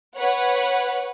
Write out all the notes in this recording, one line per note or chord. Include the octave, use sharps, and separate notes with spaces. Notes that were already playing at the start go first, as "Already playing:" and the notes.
B4 C#5 F#5